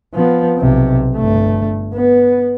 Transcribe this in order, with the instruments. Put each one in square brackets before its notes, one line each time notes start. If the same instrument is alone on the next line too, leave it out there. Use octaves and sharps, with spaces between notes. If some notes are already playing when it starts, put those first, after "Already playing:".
[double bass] F3 B3
B1 C3
G1 A3
B3